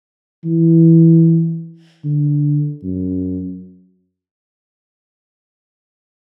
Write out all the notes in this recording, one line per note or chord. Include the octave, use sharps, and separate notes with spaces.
E3
D3
F#2